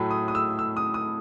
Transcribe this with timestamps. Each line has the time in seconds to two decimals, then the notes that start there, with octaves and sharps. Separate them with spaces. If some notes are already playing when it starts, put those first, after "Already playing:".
Already playing: A2 F#3 A3
0.11 D#6
0.28 D#6
0.35 E6
0.59 E6
0.77 D#6
0.94 D#6